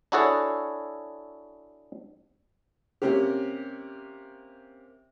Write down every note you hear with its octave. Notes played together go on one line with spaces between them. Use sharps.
D4 E4 F#4 G#4 A4 C#5
C3 A#3 C#4 G4